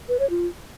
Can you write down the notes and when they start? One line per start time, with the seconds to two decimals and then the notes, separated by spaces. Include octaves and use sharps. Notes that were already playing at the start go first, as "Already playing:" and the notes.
0.09 B4
0.19 C#5
0.30 F4